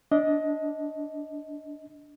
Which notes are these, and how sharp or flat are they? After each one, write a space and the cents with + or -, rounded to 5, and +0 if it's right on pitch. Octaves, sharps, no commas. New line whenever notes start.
D4 -5 D#5 +15